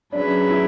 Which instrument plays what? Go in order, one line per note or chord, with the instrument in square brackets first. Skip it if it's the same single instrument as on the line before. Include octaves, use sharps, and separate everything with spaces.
[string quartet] F#3 C#4 G#4 B4 E5 [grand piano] D4
[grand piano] E4